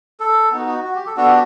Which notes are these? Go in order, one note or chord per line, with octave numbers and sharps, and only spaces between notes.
A4
B3 D#4 F#4
F#4
F#4
G4
A4
B3 D4 F#4 A4
G4